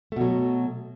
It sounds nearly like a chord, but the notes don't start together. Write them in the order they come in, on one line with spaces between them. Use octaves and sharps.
A3 B2 F#3